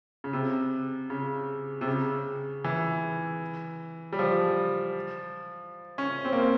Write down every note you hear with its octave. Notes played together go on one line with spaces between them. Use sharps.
C#3
C3
C#3
C3
C#3
E3
G3
F3
C#4
C4
A#3
C4